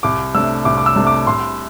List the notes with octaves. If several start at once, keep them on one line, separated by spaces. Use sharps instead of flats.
C2 D6
C3 A3 D4 E6
C2 D6
D6
E6
C3 A3 D4
D6
C2 C6